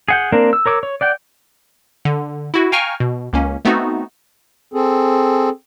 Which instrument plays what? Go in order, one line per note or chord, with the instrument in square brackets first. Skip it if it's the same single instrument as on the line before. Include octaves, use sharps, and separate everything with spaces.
[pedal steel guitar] G#4 F#5 G5
A#3 C4 D4 A#4
E6
A#4 C#5 D6 E6
C#5
D5 F#5 G5
[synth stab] D3
E4 F#4
F5 G5 G#5 A#5 C#6 F6
B2
C#2 A#3 C#4
A3 B3 C4 D#4 F#4
[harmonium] C4 G#4 A4